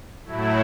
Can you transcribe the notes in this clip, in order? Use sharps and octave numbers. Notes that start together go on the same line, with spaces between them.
A2 F#3 A3 E4